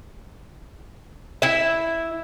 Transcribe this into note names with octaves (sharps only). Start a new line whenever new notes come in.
E4 E5